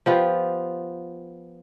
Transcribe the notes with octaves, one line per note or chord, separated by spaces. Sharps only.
F3 B3 F4 G4